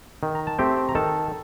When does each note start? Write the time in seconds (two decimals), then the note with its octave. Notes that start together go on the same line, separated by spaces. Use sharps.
0.23 D#3
0.35 A#5
0.47 A5
0.58 A3 C4 G4 G5
0.89 A#5
0.95 D#3 A4 A5